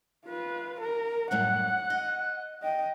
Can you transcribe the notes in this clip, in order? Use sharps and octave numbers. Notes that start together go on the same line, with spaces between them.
F4 B4
A#4
F#2 A2 G3 F#5 F#6
D#5
D#5 G5